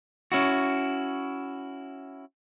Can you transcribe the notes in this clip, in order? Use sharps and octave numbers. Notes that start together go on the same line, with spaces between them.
C#4 E4 F#4